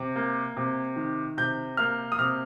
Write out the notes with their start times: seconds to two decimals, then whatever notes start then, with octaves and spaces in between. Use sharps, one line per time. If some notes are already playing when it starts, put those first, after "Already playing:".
Already playing: C3
0.16 A#3
0.57 C3
0.96 D#3
1.37 C3 G6
1.77 A#3 F6
2.12 D#6
2.18 C3 F6